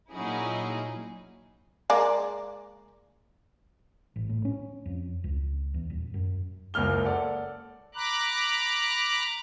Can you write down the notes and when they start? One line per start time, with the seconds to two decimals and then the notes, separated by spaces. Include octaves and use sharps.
0.12 A#2 F#3 C#4 D#4 E4 G#4
1.90 G#3 A#3 D5
4.16 A1
4.29 A2
4.45 C#4
4.86 F2
5.24 C#2
5.74 E2
5.90 D#1
6.14 F#2
6.74 F#1 C#2 A#3 F6 G7
7.05 A4 D5 F#5
7.95 A#5 B5 D6 F#6